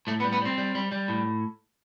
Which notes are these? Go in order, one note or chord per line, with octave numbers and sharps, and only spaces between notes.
A2 A3
B3
G3
B3
G3 C4
G3
G3
G3
A2